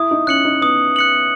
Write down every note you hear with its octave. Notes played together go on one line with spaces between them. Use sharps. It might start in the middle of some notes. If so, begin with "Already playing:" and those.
Already playing: E4 D#6
D#4
C#4 F#6 C#7 F#7
D#4
B3 D#6
F#6 C#7 F#7